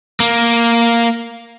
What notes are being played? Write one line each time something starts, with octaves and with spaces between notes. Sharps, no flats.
A#3